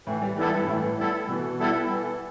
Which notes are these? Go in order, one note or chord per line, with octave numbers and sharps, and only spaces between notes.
A2 E3
G3
E3 G3 B3 E4 A4
G2
A2 E3
G3 B3 E4 A4
B2 E3
G3 B3 E4 A4
E3